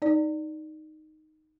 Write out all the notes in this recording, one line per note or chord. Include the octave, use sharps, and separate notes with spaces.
D#4 D5